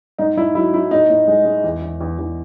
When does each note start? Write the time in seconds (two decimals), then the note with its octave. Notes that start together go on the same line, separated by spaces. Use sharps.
0.19 G#2 D#4
0.37 G#2 E4
0.55 F#3 E4
0.73 F#3 E4
0.91 A2 D#4
1.10 A2
1.28 G#3
1.46 G#3
1.64 E2
1.82 E2
2.01 E2
2.19 E2